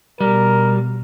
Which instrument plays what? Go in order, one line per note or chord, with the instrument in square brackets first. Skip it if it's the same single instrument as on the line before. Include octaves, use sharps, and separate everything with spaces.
[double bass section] B2 [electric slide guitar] G3 [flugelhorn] A#4